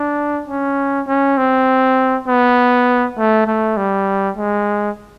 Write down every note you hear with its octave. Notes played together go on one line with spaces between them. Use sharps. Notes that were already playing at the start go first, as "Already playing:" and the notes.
Already playing: D4
C#4
C#4
C4
B3
A3
A3
G3
G#3